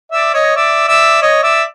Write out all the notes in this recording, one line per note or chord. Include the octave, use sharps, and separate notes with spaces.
D5 E5
C#5 D#5
D5 E5
D5 E5
C#5 D#5
D5 E5